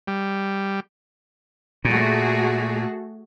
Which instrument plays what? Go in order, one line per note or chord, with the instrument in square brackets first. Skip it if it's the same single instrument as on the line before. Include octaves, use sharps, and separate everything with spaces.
[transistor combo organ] G3
[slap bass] A#2 [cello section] A3 F#4 G#4